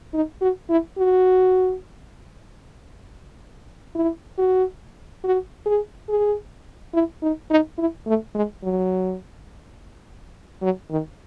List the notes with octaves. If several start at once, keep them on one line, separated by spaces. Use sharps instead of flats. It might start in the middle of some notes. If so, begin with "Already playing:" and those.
D#4
F#4
E4
F#4
E4
F#4
F#4
G#4
G#4
E4
D#4
D#4
E4
A3
G#3
F#3
F#3
D#3